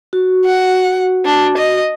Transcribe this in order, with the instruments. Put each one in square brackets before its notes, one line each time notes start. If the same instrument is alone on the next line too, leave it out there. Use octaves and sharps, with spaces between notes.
[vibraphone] F#4
[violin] F#5
D4
D#5